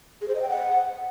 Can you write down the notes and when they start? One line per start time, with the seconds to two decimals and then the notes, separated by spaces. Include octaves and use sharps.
0.21 G#4
0.28 C5
0.35 D#5
0.42 G5
0.49 F#5